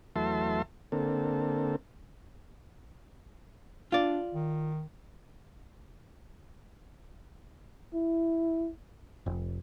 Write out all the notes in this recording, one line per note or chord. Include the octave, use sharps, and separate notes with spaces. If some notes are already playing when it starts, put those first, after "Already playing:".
E2 F#3 A3 E5 A5 C6
D3 A#3 C4 A4
D4 F4 D5
D#3
E4
F1